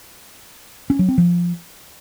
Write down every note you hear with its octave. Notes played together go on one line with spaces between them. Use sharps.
C#4
F#3
C4
F3